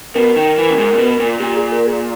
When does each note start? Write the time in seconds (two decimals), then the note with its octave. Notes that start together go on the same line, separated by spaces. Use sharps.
0.15 B2 A#4
0.36 D#3
0.58 E3
0.70 A#2
0.78 G#2
0.93 A#2
0.98 B2
1.20 A#2
1.40 A#2 G4
1.56 G#4
1.72 A#4
1.87 G#4